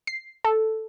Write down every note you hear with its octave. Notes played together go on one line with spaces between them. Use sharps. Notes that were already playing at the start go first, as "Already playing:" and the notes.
C7
A4